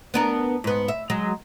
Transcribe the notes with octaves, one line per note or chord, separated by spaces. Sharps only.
B3 D4 A#4
G#2 B3
E5
F#3 G#3